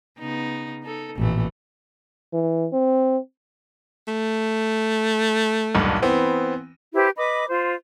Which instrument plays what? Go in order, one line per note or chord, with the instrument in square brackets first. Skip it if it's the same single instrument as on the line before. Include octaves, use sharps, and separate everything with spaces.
[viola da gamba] C#3 B3 D#4
D#4 A4
[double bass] A1 A#2 [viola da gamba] F2 E3 A3
[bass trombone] E3
C4
[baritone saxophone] A3
[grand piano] D#1 B1 G2
E3 B3 C4
[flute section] E4 G4 B4 C5
B4 D#5 B5 D6
F4 C5